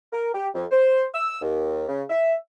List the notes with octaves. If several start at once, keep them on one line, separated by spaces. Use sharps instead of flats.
A#4
G4
F2
C5
E6
D#2
C#3
E5